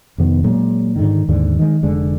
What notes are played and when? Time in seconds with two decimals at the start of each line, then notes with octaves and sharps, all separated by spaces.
0.18 F2 C3 D#3 B3
0.44 A#2 F#3 G#3
0.96 G#2 D3 D#3
1.29 D#2 G#2 D3
1.59 D#3 G#3
1.83 F1 D3 G#3